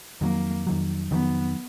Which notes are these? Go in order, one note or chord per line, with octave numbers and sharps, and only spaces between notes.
F2 D#3 F#3 A#3
F2 D#3 F#3
F2 D#3 F#3 B3